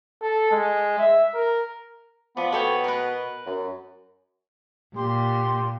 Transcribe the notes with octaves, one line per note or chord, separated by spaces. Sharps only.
A4
G#3
E5
A#4
F3 B3 D5
B2 A4 C#5 G5
A#4 B4
F#2
A#2 G4 C6